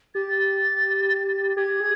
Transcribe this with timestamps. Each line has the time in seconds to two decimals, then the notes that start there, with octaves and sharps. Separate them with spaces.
0.15 G4 A6
1.57 G4 G#6
1.80 G#4